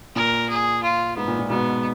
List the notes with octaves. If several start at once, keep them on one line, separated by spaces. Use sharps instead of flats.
A#2 A#4
G#4
F4
G#2 B3
A#2
A#2
G#2 B2 B3